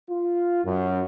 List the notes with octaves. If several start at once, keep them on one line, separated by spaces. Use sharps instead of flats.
F4
F#2